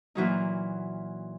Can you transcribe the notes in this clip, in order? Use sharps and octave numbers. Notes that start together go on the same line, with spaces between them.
A#2 E3 F#3 D#4